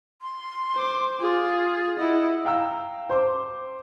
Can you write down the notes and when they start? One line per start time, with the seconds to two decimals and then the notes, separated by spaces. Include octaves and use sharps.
0.22 C6
0.75 C5 D6
1.20 F4 G#4
1.98 E4 D#5 F#5
2.45 F5 G5 A#5 E6
3.09 C5 C6 D6